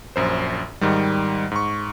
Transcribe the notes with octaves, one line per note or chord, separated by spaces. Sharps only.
A#1 F#2 C5
G#2 D#3 G3
G#2 C#6